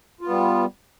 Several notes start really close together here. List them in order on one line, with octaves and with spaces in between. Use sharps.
F4 B3 G3